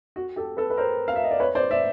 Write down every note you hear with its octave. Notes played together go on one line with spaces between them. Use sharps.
F#4
G4 A4
A4 B4
B4
A#4 C5
F5
E5
D#5
D5
B4 C#5
C5 D5
D5 E5